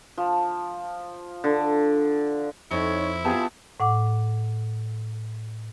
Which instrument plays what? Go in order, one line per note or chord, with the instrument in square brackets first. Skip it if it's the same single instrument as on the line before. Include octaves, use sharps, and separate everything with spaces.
[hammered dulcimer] F3
D3
[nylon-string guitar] F2 [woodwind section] D#4 C#5 [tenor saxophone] E4
[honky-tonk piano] B3 G4 A5 [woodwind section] F4 G#4
[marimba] A2 F#5 D6